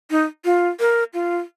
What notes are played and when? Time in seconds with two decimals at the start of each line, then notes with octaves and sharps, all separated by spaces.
0.11 D#4
0.45 F4
0.80 A#4
1.14 F4